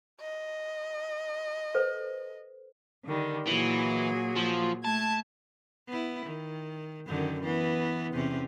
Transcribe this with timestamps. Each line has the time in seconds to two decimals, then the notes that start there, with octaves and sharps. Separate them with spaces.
0.20 D#5
1.74 A4 B4 C5
3.05 D3 D#3 G3
3.47 A#2 E3 F#3 G#4
4.36 F3
4.84 A3 A5 G#6
5.88 B3 E4
6.26 D#3
7.07 F#2 D3 D#3
7.43 E3 B3
8.13 E2 C3 C#4